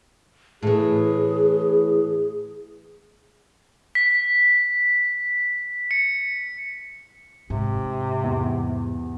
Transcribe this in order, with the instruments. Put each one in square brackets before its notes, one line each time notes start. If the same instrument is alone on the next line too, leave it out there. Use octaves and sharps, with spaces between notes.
[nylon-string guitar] A2 E3 [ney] G#4
[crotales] B6
C#7
[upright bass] G#2 [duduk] C3
[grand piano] E2